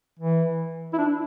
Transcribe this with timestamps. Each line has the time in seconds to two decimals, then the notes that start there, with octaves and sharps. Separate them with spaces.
0.19 E3
0.93 E4
0.98 D4